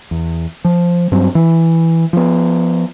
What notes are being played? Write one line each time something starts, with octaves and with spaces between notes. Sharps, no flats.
E2
F3
G2 F#3 C4
E3
F3 B3